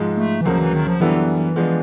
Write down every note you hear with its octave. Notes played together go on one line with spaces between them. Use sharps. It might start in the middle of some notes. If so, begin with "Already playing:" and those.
Already playing: G#2 F3 G#3
A3
E3
D2 C#3 F3 F#3 A#3
E3
D#3
F3
F#2 D3 E3 G3 B3 E4
F3 G#3 B3 D4